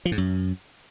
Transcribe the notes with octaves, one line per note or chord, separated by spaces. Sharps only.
F3
G#2
F#2